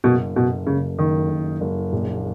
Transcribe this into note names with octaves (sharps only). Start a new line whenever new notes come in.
F#1 B2
F#1 B2
F#1 C#3
F#1 D#3
F#1
F#1
A#1